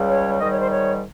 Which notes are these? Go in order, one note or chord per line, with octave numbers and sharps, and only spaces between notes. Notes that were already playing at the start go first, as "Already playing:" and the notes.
Already playing: C#2 C#3 G3
C#5
G#2 D#3 G3 D#5
C#5
C5
C#5